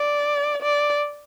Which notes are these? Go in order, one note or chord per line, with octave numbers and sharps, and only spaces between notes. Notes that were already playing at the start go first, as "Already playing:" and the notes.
Already playing: D5
D5